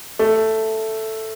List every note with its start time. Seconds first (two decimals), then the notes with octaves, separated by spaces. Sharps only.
0.19 A3